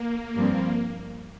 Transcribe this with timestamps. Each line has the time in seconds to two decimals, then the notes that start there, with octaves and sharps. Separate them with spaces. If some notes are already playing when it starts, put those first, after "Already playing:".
Already playing: A#3
0.35 G2 F3 C4